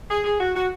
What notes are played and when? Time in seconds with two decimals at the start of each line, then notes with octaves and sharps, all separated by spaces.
0.10 G#4
0.25 G#4
0.41 F#4
0.55 F#4